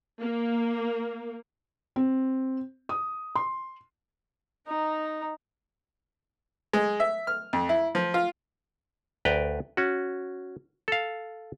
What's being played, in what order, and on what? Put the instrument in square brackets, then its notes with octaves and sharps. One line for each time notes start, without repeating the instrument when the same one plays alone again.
[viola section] A#3
[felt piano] C4
D#6
C6
[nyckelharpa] D#4 A#5
[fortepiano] G#3
E5
F6
F2
E4
F3
F4
[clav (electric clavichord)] D2 B4 D5 G5 A#5
C#4 F#4
A4 F5